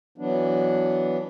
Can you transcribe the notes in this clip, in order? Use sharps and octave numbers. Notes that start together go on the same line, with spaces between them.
E3 F#3 B3 D4